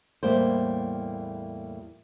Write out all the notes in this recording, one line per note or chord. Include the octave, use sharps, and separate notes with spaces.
E2 A2 G3 A#3 C5